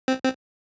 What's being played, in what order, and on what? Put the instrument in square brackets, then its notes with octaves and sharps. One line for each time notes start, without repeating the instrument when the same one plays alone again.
[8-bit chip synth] C4
C4